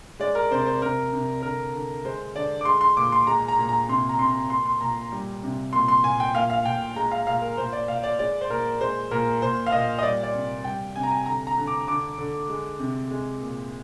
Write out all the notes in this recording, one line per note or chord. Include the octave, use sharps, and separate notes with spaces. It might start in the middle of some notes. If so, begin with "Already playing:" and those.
G#3 D5
A#4
C3 C5
C5
C3 A#4
C3
D3 A#4
D3
G#3 C5
D3 D5
D6
G#3 C6
C6
A#2 D6
C6
G#3 A#5
A#5
A#2
A#5
C3 C6
A#5
C3 C6
A#2 C6
C6
A#2 A#5
G3
C3
A#2 C6
C6
A#2 G#5
G5
A#2 F5
F5
A#2 G5
G#3 A#5
F5
A#2 F5
A#4
A#2 C5
D5
A#2 F5
D5
G#3 D5
C5
A#2 A#4
G#3 C5
A#2 A#4
A#2 C5
F5
A#2 D#5
D#5
G3 D5
D5
C3
G3 G5
C3 G#5
A#5
G#5
D3 A#5
A#5
D3
D6
D3 D6
D3
G#3
C3
G#3
A#2